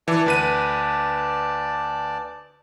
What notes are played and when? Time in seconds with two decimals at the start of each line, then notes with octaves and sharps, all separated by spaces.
0.08 E3 D5 A5 D6
0.26 D2 B4 D#7